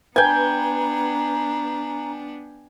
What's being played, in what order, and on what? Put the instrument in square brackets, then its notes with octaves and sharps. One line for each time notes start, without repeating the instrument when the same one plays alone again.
[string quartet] B3 D4 [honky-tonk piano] B4 [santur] G5 G#5 [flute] A#5